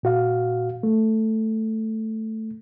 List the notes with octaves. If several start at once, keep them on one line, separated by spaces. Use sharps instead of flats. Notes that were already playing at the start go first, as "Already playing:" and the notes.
A#2 F#4 F5
A3